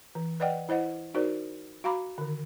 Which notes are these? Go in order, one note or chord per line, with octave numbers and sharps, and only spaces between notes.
E3
B4 D5 D#5 F#5 G5
E4 C5 D#5 F#5
D#4 F#4 A#4 C5 D5
F#4 F5 A#5 B5 D6
D3 D#3